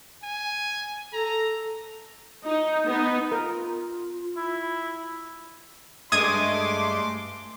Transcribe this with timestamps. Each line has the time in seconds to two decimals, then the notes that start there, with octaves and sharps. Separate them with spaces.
0.23 G#5
1.13 A4 A#5
2.47 D#4
2.86 B3 D#4
3.32 F4 A#4
4.37 E4
6.12 G2 G#3 A3 C6 D6 D#6 G#6 D#7